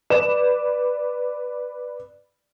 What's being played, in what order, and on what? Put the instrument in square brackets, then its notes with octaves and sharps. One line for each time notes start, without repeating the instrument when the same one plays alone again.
[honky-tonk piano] B4 D5 E7